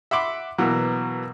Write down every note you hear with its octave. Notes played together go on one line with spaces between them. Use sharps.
E5 F#5 B5 C6 D6
B2 E3 F#3 A#3